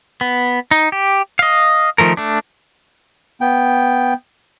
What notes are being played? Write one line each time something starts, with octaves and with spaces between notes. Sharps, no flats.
B3
D#4
G4
D#5 F5
D#3 F3 A3 A#4
A3 D4
B3 G5